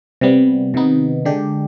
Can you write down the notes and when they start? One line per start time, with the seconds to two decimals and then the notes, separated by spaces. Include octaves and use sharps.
0.21 C3 G3 B3
0.74 C3 D#3 B3 D#4
1.25 D3 G#3 D4 G4